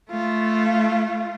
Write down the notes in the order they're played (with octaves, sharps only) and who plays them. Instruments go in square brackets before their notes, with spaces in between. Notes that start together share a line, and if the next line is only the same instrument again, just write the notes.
[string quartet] A3 F4